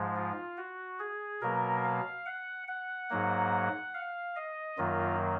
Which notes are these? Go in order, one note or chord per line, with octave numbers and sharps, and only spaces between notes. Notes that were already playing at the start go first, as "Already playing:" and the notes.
Already playing: G#2 F3 G#3
F4
F#4
G#4
B2 F#3 A#3 A#4
F5
F#5
F#5
G#2 F#3 A#3
F5
D#5
F#2 D#3 F#3 A#3 F4